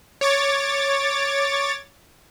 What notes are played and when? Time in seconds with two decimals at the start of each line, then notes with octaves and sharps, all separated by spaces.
0.21 C#5 D6 A6